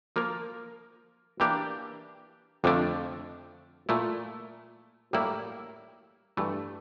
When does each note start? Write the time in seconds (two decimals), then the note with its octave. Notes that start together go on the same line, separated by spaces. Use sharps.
0.16 F3 A#3 F4 A#4
1.40 E3 A#3 D4 G4
2.64 F2 D3 F3 A3 D4
3.89 A#2 A3 E4
5.13 A2 G3 A#3 E4
6.37 G2 E3 A3